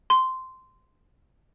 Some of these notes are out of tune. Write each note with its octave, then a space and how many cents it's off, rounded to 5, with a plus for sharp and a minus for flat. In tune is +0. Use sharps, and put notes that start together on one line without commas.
C6 -10